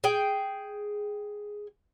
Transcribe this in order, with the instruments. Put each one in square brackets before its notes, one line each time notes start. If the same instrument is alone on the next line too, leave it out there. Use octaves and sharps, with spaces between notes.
[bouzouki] G#4 G5